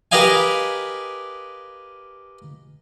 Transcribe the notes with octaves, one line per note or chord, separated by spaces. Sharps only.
G4 A#4 B4 D#5 F5 G#5